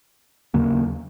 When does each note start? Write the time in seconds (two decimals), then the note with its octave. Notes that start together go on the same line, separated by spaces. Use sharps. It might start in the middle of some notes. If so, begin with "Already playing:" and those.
0.54 D#2 C#3 F#3 A#3